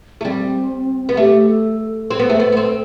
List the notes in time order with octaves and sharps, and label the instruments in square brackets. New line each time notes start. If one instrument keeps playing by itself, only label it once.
[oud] A3
[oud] G3 [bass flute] C4
[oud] B3
[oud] A3 [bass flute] G4
[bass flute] A4
A4
[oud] C4
B3
A3
B3
B3
C4